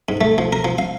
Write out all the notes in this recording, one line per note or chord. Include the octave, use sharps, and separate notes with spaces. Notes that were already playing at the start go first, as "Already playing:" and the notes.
G#2
A3
F3
A#4
F3
F5